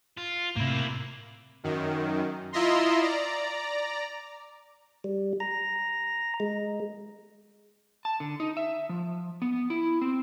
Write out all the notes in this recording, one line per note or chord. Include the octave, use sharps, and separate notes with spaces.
F4
A2 C3 A#3 E4
F#2 D#3
E4 F4 D#5 E5 A#5 C6
D5 A#5
G3
A#5
G#3
A5
D3
D#4
E5
F3
B3
E4
C4